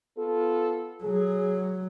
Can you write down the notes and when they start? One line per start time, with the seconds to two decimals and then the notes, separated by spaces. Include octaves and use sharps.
0.17 B3 F4 A4
1.04 F#3 G#4